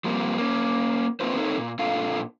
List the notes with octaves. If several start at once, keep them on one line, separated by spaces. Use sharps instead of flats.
F3 G3 A#3 C4
A#3 C#4
A#3 C4 D4 F4 B4 C5
C4 D#4 A4 A#4 C#5
A#2
A#2 D4 F4 A4 F5